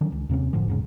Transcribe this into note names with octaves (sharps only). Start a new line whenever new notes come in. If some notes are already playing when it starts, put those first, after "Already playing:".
D3 D#3 F#3 C#4
C#2
D#2 C3 A#3 C#4
F#1 A2 D3 F3
E2 G#2 C#3